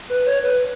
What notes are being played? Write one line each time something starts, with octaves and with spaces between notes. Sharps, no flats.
B4
C#5
B4